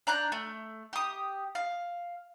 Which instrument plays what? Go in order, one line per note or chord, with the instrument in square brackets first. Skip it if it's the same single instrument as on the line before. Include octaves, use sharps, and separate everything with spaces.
[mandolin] D4 A#5 F#6 G6
A3
G4 D#6
F5